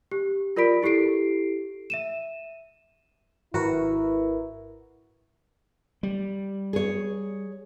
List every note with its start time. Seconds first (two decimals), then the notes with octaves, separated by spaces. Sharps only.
0.11 G4
0.56 F4 A#4 D5 B5 B6 D7
0.83 E4 G4 A4 C7 D7
1.90 E5 D#7 E7
3.54 G#1 E4 F#4 A#4 B4
6.03 G3
6.73 G#4 C#5